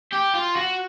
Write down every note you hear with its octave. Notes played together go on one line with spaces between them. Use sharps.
G4
F4
F#4